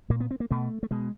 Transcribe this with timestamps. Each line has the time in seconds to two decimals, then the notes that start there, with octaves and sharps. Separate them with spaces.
0.10 A#2 A#3
0.20 B3
0.31 C4
0.40 A#3
0.51 B2 A3
0.83 A3
0.91 B2 G#3